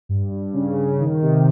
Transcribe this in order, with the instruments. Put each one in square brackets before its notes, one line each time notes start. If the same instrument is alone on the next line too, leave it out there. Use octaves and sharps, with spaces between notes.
[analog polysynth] G2
G2
C#3
C#3
D#3
C3